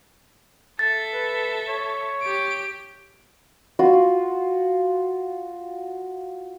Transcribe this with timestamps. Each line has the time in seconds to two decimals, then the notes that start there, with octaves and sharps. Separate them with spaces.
0.79 A4 E5 A6
1.13 B4
1.68 C#5
2.22 G4 D7
3.79 F4 F#4 C6